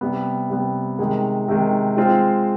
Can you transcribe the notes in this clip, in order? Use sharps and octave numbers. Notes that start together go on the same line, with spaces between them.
C3 G3 B3
C3 G3 B3
C3 D#3 G#3
C3 D#3 G#3
G#3 C4 F4 C5